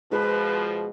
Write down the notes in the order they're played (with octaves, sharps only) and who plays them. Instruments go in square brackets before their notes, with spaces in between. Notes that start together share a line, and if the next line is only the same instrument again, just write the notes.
[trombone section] B2 F3 [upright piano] G#3 [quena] B4